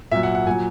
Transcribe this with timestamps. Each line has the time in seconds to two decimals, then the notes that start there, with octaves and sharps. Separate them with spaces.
0.11 A#2 F#3 E5
0.23 F#5
0.35 F#5
0.47 A#2 F#3 G#5